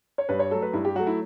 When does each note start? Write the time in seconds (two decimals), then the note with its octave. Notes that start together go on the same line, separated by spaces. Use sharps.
0.18 C#5
0.29 G2 B4
0.39 C#5
0.51 F#3 A3 A4
0.62 B4
0.73 G2 E4
0.85 G4
0.95 F#3 A3 F#4
1.07 E4